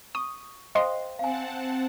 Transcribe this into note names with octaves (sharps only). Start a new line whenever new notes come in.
C#6 D#6
C5 D#5 F5 G5 C6
C4 F5 F#5 G#5 A5